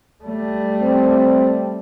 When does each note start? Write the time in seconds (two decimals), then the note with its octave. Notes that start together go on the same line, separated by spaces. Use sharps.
0.24 G3 A3
0.83 C4